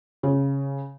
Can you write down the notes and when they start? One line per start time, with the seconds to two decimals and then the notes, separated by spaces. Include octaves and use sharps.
0.23 C#3